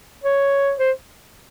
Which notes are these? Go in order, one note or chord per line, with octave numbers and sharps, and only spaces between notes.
C#5
C5